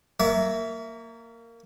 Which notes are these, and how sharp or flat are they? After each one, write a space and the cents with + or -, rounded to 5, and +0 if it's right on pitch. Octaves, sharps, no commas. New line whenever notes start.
A#3 -15 C#5 +40 E5 +0